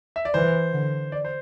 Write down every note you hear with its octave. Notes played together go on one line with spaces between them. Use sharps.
E5
D5
E3 C5
D3
D5
C5